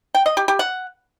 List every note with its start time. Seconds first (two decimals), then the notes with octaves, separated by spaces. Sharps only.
0.15 G5
0.26 D#5
0.37 G4
0.48 G4
0.59 F#5